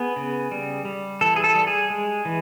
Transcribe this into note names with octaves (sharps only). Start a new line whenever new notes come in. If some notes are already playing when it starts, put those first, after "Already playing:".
Already playing: B3 G#4
C#3
G3
G3
E3 A4
G#4
A4
G3
G#4
G#3
E3